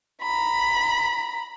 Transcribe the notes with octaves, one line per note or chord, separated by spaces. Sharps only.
A#5 B5